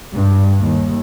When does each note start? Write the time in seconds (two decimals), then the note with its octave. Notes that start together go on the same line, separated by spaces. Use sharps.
0.13 G2
0.60 D#2